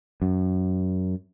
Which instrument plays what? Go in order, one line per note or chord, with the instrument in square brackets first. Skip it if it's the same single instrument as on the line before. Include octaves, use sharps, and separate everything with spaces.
[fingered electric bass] F#2